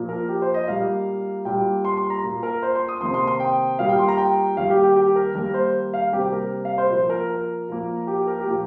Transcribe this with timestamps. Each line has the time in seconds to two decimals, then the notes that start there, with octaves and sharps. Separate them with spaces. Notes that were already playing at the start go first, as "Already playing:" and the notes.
Already playing: A#2 F3 A#3
0.09 A#4
0.29 G4
0.42 C5
0.54 D#5
0.67 A#2 G3 A#3 F5
1.45 A#2 G3 A#3 G5
1.85 C6
1.97 C6
2.10 A#5
2.24 A#2 A#3
2.43 A#4
2.63 C5
2.75 C6
2.89 D#6
3.01 C3 D#3 A#3 C6
3.14 C6
3.27 C6
3.40 G5
3.79 A#2 G3 A#3 F5
3.89 G5
3.99 C6
4.08 A#5
4.18 G5
4.57 D#3 G3 A#3 F5
4.70 G4
4.83 G4
4.96 G4
5.16 A#4
5.35 D#3 G3 A#3 A#4
5.54 C5
5.94 F5
6.13 C3 G3 A#3 G4
6.24 G4
6.32 A#4
6.65 F5
6.78 C5
6.90 A#2 F3 A#3 C5
7.10 A#4
7.30 A#4
7.69 A#2 F3 A#3
8.07 G4
8.27 A#4
8.40 G4
8.46 A#2 F3 A#3